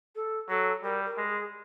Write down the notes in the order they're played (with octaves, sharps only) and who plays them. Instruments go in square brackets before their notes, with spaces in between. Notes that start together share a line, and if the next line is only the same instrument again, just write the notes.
[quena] A4
[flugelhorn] F#3 [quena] A4
[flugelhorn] G3 [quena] A#4
[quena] A#4
[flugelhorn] G#3
[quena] G#4